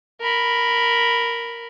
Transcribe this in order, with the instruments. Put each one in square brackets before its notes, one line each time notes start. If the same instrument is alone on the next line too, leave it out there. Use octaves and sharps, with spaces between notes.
[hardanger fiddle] A#4 B5